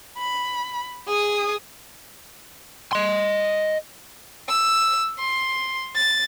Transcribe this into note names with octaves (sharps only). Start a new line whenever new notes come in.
B5
G#4 D#6
D#5 C6
E6
C6
A6